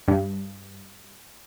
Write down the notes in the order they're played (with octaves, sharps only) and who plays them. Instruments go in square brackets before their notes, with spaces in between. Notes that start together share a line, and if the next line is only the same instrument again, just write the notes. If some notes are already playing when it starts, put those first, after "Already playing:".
[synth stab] G2